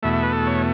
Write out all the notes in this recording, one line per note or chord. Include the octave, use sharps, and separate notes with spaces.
E2 B2 A3 E5
E5
B4
A4
C#5